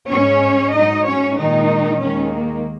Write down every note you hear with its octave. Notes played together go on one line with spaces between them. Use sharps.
G#2 G#3 C#4 C#5
G#2 F#3 D#4 D#5
C#4 C#5
A#2 D#3 G#3 D#4
D#2 D#3 G#3 C#4
A#3